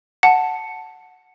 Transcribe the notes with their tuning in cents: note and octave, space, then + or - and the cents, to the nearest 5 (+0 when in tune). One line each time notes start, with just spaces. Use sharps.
F#5 +0 A5 +0